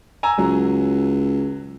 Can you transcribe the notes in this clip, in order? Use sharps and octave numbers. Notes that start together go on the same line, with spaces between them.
G#5 A#5 E6
C#2 F#3